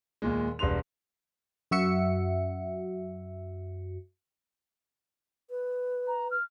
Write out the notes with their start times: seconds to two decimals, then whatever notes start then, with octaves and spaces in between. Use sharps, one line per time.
0.22 D#2 A#2 G#3
0.59 E1 G3 B4 C6 F7
1.71 F#2 F#4 E5 C#7
5.50 B4
6.07 A#5
6.31 F6